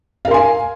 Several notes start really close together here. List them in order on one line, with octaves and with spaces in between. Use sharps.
F5 A#4 C6 G#5